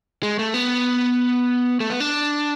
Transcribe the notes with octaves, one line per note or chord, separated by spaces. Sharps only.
G#3
A3
B3
A3
B3
D4